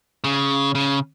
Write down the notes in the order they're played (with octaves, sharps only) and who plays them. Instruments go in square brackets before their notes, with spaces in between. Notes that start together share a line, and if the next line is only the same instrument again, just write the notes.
[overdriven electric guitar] C#3
C#3